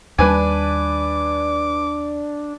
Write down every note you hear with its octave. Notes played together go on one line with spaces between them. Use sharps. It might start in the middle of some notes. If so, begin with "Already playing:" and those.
D#2 G3 D4 B4 G#5 D6